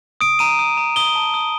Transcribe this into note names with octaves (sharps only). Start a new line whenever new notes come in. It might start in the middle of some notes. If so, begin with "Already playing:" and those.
D#6 D7
A#5 D#7
D#6
A#5
D#6 G7
A5
D#6